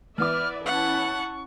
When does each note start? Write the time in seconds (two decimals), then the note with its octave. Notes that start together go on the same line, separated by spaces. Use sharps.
0.18 E3 B3 B4 D5 E5 D6 F6
0.66 C#4 E4 F#5 A5 C#6